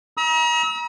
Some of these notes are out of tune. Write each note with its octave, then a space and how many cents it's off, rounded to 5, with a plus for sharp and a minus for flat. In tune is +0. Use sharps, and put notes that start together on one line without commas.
A#5 +40 E6 -45